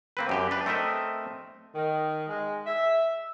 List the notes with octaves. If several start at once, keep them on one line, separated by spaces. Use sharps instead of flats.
A#3 C4 B4
F#2 G4 G5
D4 B4
A3 C4 A#4 D#5 E5
D#3
G#3
E5